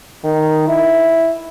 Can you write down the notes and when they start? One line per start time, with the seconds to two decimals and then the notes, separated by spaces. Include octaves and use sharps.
0.24 D#3
0.68 E4